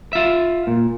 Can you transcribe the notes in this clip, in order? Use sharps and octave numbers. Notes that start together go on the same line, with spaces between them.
F4 E5
A#2